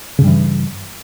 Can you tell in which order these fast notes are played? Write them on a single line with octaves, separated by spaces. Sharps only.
C#3 G2 G3 E3